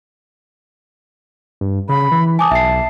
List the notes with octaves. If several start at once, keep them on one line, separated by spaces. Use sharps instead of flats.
G2
C#3 B5
E3
G#5 A5 D6 D#6
B1 E5 C7